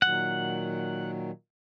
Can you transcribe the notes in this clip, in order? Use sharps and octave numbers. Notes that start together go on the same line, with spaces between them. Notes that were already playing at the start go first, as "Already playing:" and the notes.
A#2 D#3 F#3 F#5